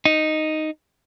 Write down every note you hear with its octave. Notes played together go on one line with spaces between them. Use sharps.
D#4